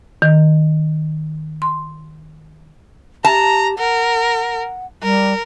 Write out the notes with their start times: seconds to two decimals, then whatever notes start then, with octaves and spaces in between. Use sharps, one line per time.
0.22 D#3
1.62 C6
3.25 G4 A5 A#5
3.78 A#4 F#5
5.03 G3 A#4